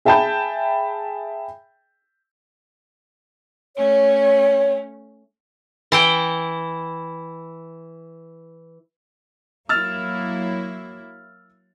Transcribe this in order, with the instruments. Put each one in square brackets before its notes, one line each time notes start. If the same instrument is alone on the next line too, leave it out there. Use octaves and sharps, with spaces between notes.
[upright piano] G#4 E5 G5 A5 B5 G6
[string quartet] A3 C#4 [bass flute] C#5
[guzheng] E3 E4 G5
[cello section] F#3 A#3 E4 [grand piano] E6 F6 A6